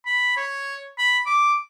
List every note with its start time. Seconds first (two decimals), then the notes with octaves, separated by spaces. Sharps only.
0.06 B5
0.37 C#5
0.98 B5
1.26 D6